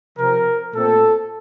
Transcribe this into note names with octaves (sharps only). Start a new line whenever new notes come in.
C3 F3 C4 A#4
A#2 A3 C4 A4